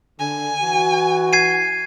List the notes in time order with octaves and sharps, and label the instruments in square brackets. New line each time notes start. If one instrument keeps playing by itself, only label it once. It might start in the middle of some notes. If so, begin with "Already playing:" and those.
[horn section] D3 [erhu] G#5
[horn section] E3 E4 F#4
[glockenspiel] G#6 C7 D#7